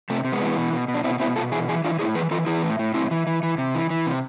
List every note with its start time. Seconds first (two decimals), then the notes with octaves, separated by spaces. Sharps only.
0.10 C3 A3
0.25 C3
0.32 G#3 B3
0.42 E3
0.57 B2
0.73 B2
0.88 B2
0.94 D4
1.04 B2 C4 E4
1.20 B2 C4 E4
1.36 B2 F4 A4
1.52 E3 E4 G#4
1.68 E3 E4 G#4
1.84 E3 D4 F4
1.99 A2 E4 G#4
2.15 E3 G#4 B4
2.31 E3 F4 A4
2.47 E3 E4 G#4
2.64 A2
2.79 A2
2.94 A2 C4 E4
3.11 E3
3.27 E3
3.43 E3
3.58 C3
3.75 E3
3.90 E3
4.06 C3